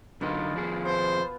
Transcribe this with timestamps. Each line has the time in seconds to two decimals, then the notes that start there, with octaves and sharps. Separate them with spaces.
0.21 F#2 D3 A#3 B3 D#4 F4
0.54 F2 F3 G#4
0.85 B2 B3 C5